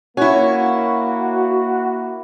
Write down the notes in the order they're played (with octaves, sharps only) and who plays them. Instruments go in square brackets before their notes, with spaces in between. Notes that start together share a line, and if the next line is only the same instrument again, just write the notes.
[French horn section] A#3 [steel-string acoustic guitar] C#4 E4 [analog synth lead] F#4